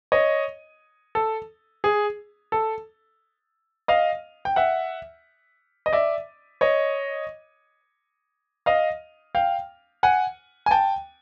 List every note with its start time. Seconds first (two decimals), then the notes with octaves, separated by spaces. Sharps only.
0.12 C#5 D#5
1.15 A4
1.84 G#4
2.52 A4
3.88 D#5 F5
4.45 G5
4.56 E5 F#5
5.86 D#5
5.93 D5 E5
6.61 C#5 D#5
8.66 D#5 F5
9.35 F5 G5
10.03 F#5 G#5
10.66 G#5
10.71 G5 A5